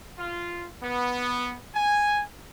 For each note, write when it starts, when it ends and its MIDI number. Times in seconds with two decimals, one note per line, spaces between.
0.18 0.67 65
0.83 1.56 59
1.75 2.22 80